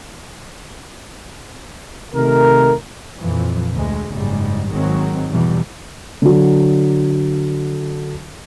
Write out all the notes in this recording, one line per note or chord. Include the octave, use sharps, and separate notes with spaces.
C3 D#3 A3 A#4
F2 A#2 E3 F3
D2 G#3
F#1 G#2 G3 G#3
G#1 D#3 F#3 G#3 C4
E2 B2 E3 G3
D3 F#3